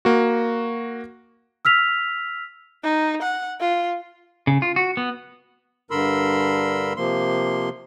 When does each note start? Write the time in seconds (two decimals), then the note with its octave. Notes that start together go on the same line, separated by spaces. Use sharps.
0.05 A#3 F#4
1.65 E6 F6 B6 F7
2.84 D#4
3.22 F#5
3.60 F4
4.47 C#3
4.62 F4
4.76 F#4
4.97 B3
5.91 G2 D3 A#4 B5 C6 E6
6.97 C3 F3 A#3 C6